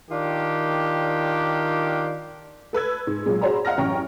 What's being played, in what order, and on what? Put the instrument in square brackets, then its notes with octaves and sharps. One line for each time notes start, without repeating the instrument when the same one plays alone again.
[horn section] D#3 D4 F4 G4
[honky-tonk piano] A4 B4 E6 G#6
G#2
A#2 F#3 G#3
F#4 G#4 C5 A#5 B5
D#5 F5 F#5 A#5 F6 A#6
A1 F#2 G5 A#5 C#6